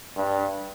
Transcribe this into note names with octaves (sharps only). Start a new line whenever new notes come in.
G2